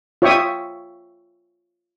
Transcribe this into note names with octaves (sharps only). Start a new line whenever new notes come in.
F4 C#5 E5 G5 C#6 D#6